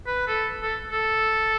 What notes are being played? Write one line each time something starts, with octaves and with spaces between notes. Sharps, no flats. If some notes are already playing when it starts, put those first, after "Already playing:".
B4
A4
A4
A4